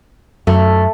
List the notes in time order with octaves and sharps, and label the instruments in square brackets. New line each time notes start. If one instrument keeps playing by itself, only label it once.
[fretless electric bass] F#2 [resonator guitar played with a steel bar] A3